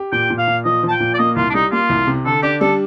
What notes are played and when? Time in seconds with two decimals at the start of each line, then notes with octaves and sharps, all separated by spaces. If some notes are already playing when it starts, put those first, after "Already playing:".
Already playing: G4
0.12 A#2 G5
0.30 A#2
0.38 F5
0.47 A#2
0.65 F3 D#5
0.83 F3 A5
0.91 G5
1.00 A#2
1.14 D5
1.18 A#3 D#5
1.36 C2 F4
1.50 D4
1.54 G3 D#4
1.72 A#3 F4
1.89 C2
2.07 C3
2.25 D3 A4
2.43 D4 G4
2.61 G3 A4